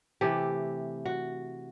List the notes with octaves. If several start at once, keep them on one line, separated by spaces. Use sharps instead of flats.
C3 E3 A3 G4
F#4